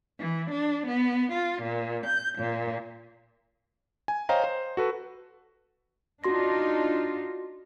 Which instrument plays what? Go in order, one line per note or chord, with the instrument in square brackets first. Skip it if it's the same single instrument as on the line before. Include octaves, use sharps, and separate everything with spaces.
[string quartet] E3
D4
B3
F4
A#2
G6
A#2
[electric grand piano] G#5
C5 C#5 D#5 F5 G5 A#5
C5
F#4 A4 B4
[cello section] D4 D#4 F4 [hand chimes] F#4 C6 A#6